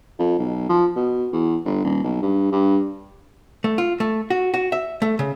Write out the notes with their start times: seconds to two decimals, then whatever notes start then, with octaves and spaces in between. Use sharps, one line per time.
0.19 F2
0.39 B1
0.69 F3
0.96 B2
1.33 E2
1.65 G1
1.84 D#1
2.04 B1
2.22 G2
2.52 G2
3.64 A3
3.78 F4
4.00 A3
4.30 F#4
4.54 F#4
4.72 E5
5.02 A3
5.19 C#3